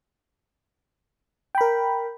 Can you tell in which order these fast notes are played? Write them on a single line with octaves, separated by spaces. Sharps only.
G5 B5 A#4